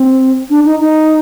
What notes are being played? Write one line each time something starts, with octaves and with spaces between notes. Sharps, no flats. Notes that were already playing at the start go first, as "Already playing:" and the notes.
Already playing: C4
D4
D#4
D#4